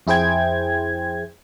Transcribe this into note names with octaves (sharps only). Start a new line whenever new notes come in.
F2 E4 G#4 C5 G5 G#6